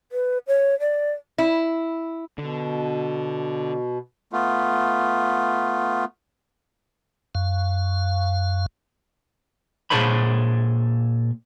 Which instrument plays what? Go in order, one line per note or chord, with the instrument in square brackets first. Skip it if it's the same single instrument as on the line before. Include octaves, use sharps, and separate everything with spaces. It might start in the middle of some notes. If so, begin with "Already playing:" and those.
[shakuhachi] B4
C#5
D5
[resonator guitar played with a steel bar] E4
[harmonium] B2 [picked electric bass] D3
[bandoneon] A3 B3 F4
[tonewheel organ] F#2 F5
[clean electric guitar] A#2 G#4 A4 C5 C#5 B5